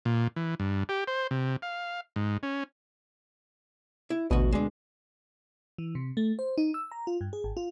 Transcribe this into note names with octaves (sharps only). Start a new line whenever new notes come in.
A#2
E3
G2
G4
C5
C3
F5
G#2
C#4
E4
A1 D2 B2 F#4 D#5
G#3 D4
E3
C3
A3
C5
D#4
E6
A#5
F4
G2
G#4
G#1
F4